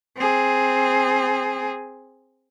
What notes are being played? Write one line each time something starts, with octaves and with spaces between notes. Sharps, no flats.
C4 G#4